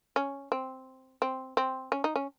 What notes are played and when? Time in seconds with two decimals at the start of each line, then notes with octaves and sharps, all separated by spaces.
0.16 C#4
0.52 C4
1.22 C4
1.57 C4
1.92 C#4
2.04 D#4
2.16 C#4